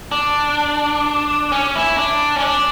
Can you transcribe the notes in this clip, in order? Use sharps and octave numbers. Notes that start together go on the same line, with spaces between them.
D4
C#4
E4
D4
C#4
D4